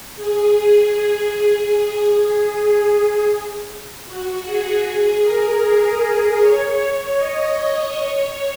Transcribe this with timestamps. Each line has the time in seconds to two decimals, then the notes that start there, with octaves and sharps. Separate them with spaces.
0.16 G#4
1.72 G#4
4.05 F#4
4.44 G#4
4.83 G#4
5.21 A#4
5.61 G#4
6.38 C#5
7.17 D#5
7.95 C#5